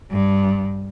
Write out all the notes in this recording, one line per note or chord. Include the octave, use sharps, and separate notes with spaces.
G2